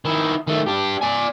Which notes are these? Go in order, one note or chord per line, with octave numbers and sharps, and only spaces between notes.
D#3 E4
D#3 A3
D4 G4
D5 G#5